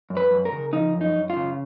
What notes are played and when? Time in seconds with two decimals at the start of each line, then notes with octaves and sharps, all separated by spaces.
0.10 F#2
0.17 B4
0.31 F#2
0.45 A#4
0.52 C#3
0.73 F3 D#4
0.94 F#2
1.01 D#4
1.15 F#2
1.30 F4
1.36 C#3